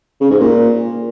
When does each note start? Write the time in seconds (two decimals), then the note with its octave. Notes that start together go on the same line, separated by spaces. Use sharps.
0.21 C#3
0.30 G#2
0.40 A#2